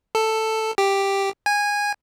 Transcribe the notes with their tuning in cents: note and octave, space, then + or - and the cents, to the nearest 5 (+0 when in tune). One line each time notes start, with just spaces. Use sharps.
A4 +5
G4 +5
G#5 -15